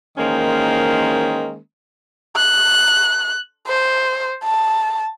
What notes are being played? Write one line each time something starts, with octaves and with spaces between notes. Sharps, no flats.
D#3 E3 G#3 A#3 C#4 C5
F#6
C5
A5